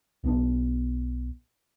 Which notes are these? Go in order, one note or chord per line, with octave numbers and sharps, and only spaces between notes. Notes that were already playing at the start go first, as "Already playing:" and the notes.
B1 B3 D4